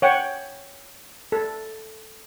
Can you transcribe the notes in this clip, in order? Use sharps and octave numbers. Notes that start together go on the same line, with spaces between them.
C#5 F#5 G5
A4